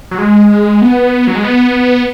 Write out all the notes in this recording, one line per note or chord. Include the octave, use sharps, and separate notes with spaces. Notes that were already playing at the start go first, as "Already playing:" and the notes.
F#3
G#3
B3
F#3
G#3
B3